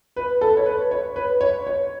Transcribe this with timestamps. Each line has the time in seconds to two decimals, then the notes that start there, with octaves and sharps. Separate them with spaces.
0.16 B4
0.41 A4
0.57 C#5
0.66 B4
0.91 C#5
1.16 B4
1.41 C#5
1.67 C#5